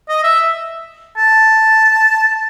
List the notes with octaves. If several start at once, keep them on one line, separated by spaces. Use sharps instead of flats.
D#5
E5
A5